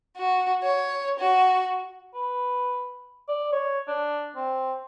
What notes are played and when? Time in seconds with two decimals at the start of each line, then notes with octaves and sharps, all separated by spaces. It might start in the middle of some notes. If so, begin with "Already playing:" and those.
0.17 F#4
0.63 C#5
1.20 F#4
2.14 B4
3.29 D5
3.53 C#5
3.88 D4
4.36 C4